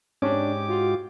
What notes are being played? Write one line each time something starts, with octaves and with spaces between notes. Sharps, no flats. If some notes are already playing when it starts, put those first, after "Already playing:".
G#2 C#4 D4 G4 D6
F4 F#4